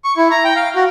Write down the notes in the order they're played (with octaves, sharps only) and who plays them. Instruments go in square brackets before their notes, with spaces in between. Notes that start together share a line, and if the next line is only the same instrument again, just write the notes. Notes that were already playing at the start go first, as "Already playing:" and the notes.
[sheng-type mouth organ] C#6
E4
A#5
G5
F5
F#4